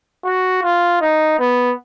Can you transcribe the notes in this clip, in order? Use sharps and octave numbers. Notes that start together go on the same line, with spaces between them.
F#4
F4
D#4
B3